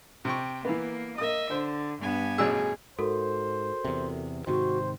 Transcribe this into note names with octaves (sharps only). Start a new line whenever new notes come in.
C3 G5 C#6
E3 A#3 B3
A#3 D#5 E5 D#6
D3 C5
G2 B3 G#5
A1 B2 G#4 E6
G#2 F#4 A4 A#4 C5
E2 C3
G#2 C3 D#3 F#4 C5